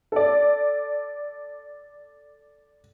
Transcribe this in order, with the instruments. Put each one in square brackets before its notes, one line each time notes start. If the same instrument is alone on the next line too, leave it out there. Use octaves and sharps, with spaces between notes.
[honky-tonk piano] A4 D5